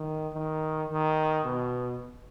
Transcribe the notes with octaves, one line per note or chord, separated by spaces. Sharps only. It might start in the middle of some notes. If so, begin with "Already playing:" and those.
Already playing: D#3
D#3
D#3
B2